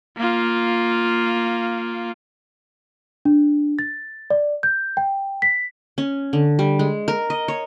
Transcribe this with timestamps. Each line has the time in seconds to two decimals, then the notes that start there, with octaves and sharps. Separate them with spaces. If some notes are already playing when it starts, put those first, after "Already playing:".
0.18 A#3 F4
3.25 D4
3.79 A6
4.30 D5
4.63 G6
4.97 G5
5.42 B6
5.98 C#4
6.33 D3
6.59 G3
6.79 G#3
7.08 A#4
7.30 D#5
7.48 C#5